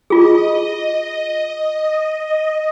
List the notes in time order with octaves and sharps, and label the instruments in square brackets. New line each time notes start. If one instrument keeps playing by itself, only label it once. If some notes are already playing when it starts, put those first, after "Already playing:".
[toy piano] F4 G#4 [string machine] D#5